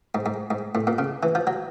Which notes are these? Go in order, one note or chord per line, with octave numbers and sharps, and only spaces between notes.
G#2
G#2
G#2
A2
A#2
C#3
E3
F3
F#3